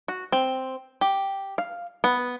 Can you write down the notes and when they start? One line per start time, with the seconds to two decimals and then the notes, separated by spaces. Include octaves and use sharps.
0.08 F#4
0.32 C4
1.01 G4
1.58 F5
2.04 B3